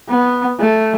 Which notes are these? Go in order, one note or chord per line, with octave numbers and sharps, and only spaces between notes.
B3
A3